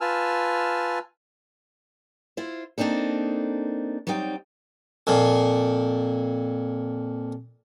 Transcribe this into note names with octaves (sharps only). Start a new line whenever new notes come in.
F4 B4 G#5 A5 E6 F6
E4 F4 C5
A#3 C4 D4 D#4 A4
F#3 G3 C4 D#4 G5
F2 A#2